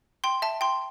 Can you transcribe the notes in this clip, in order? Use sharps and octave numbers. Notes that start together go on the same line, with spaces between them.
G5 C6
E5 A5
G5 C6